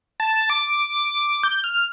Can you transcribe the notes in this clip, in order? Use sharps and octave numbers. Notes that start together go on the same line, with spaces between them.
A5
D6
G6
F6